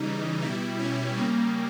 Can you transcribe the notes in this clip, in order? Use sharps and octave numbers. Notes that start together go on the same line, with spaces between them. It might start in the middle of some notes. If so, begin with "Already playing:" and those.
Already playing: C#3 E3 G3 D#4
B2 G3 E4
C#4
C#3 G3 A#3